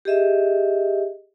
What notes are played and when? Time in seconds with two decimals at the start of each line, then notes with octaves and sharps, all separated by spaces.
0.05 G4 G#4 D#5 E5